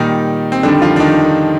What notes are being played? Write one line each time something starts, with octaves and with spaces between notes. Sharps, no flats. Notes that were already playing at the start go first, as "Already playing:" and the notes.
Already playing: A#2 D#3 G3 D#4
C4
F2 D3 D#3 G3 D4
F3 F4
D4
D#3 D#4